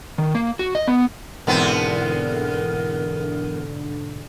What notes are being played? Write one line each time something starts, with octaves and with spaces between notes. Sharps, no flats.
D#3
A#3
F#4
D#5
B3
E2 G#2 B2 D3 B3 C4 A#4